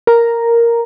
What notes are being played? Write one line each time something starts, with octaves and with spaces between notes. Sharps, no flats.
A#4 A#5